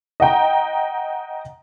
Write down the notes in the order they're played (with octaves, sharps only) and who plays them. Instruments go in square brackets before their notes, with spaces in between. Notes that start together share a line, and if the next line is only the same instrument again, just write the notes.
[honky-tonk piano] D#5 F#5 G5 A#5